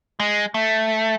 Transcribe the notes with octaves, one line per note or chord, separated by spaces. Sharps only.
G#3
A3